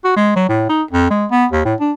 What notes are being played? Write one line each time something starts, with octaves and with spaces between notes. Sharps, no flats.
F#4
G#3
F#3
A2
D#4
F2
G#3
B3
D#2
A2
D4